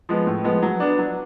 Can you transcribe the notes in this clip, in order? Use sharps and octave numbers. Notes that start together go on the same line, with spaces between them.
F3 G#3 B3
A2
F3 G#3 B3
F#3
B3 D4
F#3